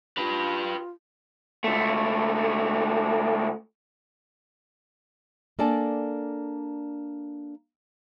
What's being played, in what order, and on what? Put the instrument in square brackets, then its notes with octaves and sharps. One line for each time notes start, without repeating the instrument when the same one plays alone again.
[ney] F4 [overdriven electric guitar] G4 B4
[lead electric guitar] C#2 A3
[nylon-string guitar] A#3 D4 A4 D5 G#5 A5